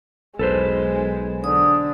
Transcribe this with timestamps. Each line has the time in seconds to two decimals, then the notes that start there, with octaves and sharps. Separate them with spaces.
0.39 B1 G#3 A4 B4 C5
1.44 D3 D#6